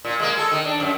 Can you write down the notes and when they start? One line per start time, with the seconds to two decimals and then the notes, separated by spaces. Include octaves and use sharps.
0.05 A#2
0.20 G#3 A#3
0.38 A4
0.52 D#3
0.65 D4
0.80 F#2